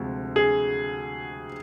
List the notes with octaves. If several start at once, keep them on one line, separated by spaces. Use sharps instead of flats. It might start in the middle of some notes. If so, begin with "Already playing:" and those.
Already playing: D2 C3 F3 G#3
G#4